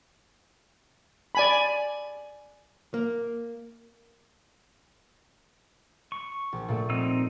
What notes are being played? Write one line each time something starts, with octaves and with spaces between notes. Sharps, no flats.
D5 G#5 B5
A#3
C#6
A#1
A#2 A3 A4
C4 D#4 E6